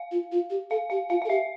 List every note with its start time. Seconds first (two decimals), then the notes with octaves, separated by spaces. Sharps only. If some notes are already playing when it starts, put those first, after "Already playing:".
Already playing: F5
0.12 F4
0.32 F4
0.50 G4
0.70 A4 F5
0.90 G4 F5
1.10 F4 F5
1.22 F5
1.25 A4
1.30 G4 E5